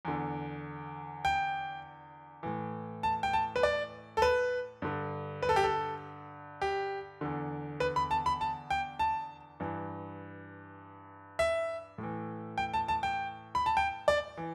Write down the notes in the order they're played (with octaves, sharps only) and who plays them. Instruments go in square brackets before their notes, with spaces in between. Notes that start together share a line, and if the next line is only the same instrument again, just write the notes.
[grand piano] E2 D3
G5
A2 E3
A5
G5
A5
B4
D5
A4
B4
G2 D3
B4
A4
G4
A4
G4
E2 D3
B4
B5
A5
B5
A5
G5
A5
G2 E3
E5
A2 E3
G5
A5
A5
G5
B5
A5
G5
D5
E3